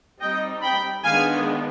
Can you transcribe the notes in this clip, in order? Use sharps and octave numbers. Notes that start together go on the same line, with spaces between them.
G3 C4 D#4 D#5 G5
G5 B5
D#3 G#3 B3 D4 F5 G#5